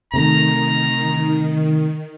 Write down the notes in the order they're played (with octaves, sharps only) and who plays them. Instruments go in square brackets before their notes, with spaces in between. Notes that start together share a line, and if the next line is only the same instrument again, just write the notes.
[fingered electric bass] C3 A3 [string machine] D#3 [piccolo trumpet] A#5